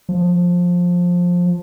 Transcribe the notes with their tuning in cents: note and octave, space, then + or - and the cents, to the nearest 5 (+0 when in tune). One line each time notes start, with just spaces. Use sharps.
F3 +15